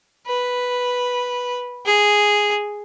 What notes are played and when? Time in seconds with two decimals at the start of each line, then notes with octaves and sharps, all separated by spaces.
0.27 B4
1.86 G#4